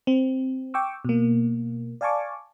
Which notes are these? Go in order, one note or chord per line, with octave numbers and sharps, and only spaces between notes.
C4
G5 C#6 D6 E6
B2 A#3
D5 F5 G#5 A5 C#6 D6